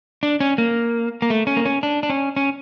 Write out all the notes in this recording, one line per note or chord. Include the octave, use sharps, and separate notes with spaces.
D4
C#4
A#3
A#3
A3
C#4
A#3
C#4
D4
D4
C#4
C#4